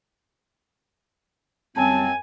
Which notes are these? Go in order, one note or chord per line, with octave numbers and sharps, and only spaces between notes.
F#2 G3 C4 C#4 G#5 A5